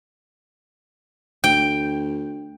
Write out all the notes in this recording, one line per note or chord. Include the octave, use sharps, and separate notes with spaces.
D2 G5